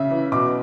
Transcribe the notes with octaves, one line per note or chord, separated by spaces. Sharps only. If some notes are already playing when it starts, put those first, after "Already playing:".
Already playing: C#3 E5
E3
B2 D6